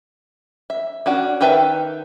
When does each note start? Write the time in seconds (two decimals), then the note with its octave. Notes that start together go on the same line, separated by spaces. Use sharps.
0.70 E5
1.06 C#4 D4 F#4
1.41 D#3 G4 B4 E5 A5